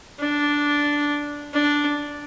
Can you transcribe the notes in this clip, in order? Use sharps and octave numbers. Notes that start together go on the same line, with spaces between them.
D4
D4